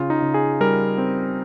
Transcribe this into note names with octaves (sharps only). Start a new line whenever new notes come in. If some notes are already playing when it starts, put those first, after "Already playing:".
Already playing: C#3 F4
D#4
C#3
G#4
G3 A#4
C4